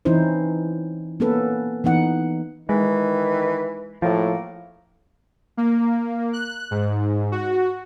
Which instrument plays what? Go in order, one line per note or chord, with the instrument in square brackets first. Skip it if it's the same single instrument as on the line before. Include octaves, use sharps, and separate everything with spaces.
[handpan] E3 C4 C#4 D#4 E4 C5
A#3 B3 C#4 A4 B4
E3 B3 D#4 F#5
[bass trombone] D#3 [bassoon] E3 [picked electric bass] G#3
[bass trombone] A2 [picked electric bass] F3 [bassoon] A#3
[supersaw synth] A#3
F#6
G#2
F#4